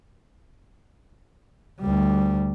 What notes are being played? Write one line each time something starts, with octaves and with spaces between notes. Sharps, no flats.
D2 G3